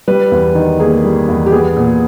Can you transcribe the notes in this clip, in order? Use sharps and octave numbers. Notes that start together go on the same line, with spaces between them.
G3 B4
E2
D#3
A#3 G#4
G3
E2
G4
B3 G#4
A#2